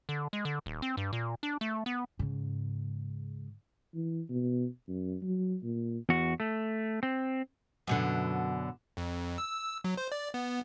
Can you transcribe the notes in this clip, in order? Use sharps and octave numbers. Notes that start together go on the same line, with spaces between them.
D3
G#3
D3
D#1
C4
G2
A#2
D4
A3
B3
G#2 C#3
E3
B2
F#2
F#3
A#2
E2 F#4
A3
C4
F#2 B2 D3
F2
E6
F#3
C5
D5
B3